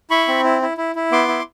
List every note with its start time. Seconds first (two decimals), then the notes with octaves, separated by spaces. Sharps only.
0.11 E4 B5 C#6
0.28 C4
0.44 E4
0.62 E4
0.77 E4
0.95 E4
1.12 B3 C6 D6
1.28 E4